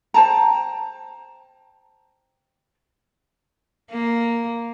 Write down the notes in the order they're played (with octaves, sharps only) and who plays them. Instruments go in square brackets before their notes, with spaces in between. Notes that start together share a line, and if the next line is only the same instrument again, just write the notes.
[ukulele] C5 G5 A5 A#5
[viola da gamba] A#3